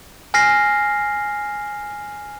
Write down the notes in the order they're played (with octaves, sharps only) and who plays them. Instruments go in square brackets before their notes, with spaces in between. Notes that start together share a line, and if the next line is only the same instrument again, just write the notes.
[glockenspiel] G#5 F6 A#6 C7